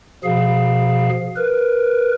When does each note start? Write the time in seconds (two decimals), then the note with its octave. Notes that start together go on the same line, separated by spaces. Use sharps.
0.24 B2 F3 G#4 F5
1.37 A#4 B4